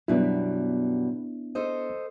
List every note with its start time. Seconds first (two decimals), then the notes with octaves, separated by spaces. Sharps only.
0.08 F#2 B2 G3 B3 D4 E4
1.55 A4 C5 D#5